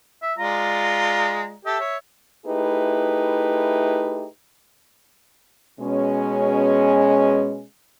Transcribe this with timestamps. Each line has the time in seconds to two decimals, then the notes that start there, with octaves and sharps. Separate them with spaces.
0.22 E5
0.38 G#3 F4 D5 A#5
1.65 G4 A4 E5
1.80 C#5
2.46 A3 D#4 E4 G4 G#4 B4
5.80 B2 G#3 C#4